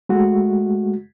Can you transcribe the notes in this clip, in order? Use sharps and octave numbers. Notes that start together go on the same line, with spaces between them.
G#3 A3 F#4